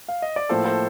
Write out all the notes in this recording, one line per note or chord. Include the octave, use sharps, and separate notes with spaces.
F5
D#5
D5
A2 F3 A#3 A4 C5
A4 C5